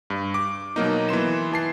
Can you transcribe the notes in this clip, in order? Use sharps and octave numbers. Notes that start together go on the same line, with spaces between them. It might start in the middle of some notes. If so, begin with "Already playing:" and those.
G2
D6
B2 F#3 A#3 D#4
E3 B3 C6 E7
E3 A5 C7